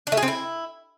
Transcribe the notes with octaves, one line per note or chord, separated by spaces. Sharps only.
D4
A3
G#4
C4
E4